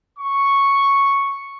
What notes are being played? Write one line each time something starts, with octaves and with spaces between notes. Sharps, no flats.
C#6